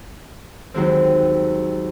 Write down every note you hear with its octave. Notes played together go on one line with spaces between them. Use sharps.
D#2 F#3 G#3 C4